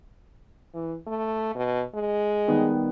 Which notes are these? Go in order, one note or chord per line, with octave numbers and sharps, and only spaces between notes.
E3
A3
B2
G#3
D#3 G3 B3